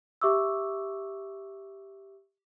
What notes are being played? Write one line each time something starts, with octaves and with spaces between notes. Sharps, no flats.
G4 E5 C#6 D6 E6